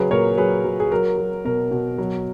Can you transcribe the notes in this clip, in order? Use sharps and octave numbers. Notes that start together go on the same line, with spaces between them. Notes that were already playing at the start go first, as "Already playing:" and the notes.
Already playing: C#3 F#3 G#4 B4
A#2 A#4 C#5
F#3 G#4 B4
F#3
G#4
F#3 A#4
F#3
B2 A#4
B2
F#3